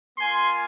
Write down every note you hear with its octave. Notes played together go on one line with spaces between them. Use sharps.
A#3 F4 G#5 C6